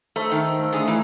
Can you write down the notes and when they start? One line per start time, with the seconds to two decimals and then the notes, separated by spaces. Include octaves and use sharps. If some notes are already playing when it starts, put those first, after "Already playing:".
0.16 A3 D#4 A4 C5
0.32 D#3
0.59 A3 E5 F5
0.72 D3 G#4
0.88 E3 D#4 D#5 A#5